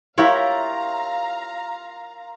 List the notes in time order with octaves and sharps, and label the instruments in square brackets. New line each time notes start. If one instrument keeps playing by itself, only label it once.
[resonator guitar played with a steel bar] E4 G4 E5 [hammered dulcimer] F4 A#4 [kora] C#5 [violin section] F5 A#5